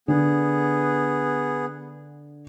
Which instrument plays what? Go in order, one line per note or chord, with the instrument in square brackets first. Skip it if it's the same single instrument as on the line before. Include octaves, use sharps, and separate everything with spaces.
[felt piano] D3 [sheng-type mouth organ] B3 G#4